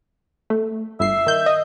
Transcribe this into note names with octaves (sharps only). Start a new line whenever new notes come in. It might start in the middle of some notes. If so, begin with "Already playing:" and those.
A3
G1 E5 C7
D#3 G6
D#5